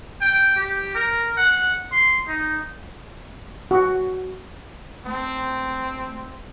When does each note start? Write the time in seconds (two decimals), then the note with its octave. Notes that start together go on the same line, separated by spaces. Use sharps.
0.21 G5
0.56 G4
0.95 A#4
1.37 F#5
1.92 C6
2.27 D#4
3.71 F#4
5.06 A3 C4